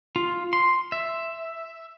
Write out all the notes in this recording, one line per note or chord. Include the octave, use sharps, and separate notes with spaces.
F4
C6
E5